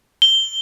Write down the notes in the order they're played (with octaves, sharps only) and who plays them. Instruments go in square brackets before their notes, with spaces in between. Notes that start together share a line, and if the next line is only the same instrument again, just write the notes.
[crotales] G7